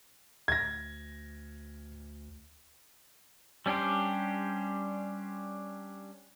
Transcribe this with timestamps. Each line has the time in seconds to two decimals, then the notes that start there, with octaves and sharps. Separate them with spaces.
0.48 D2 G#6 A#6
3.66 G3 C#4 D4 G4 C5